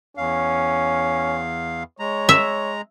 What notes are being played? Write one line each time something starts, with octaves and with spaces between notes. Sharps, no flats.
E2 C#4 F5
G#3 C#5 A#5
E5